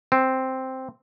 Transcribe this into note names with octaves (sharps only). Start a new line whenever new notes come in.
C4